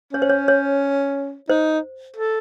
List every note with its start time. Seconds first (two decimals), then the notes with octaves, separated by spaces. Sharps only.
0.13 C#4 C#5
0.22 C5
0.30 C#5
0.48 C#5
1.49 D#4 C5
2.16 A4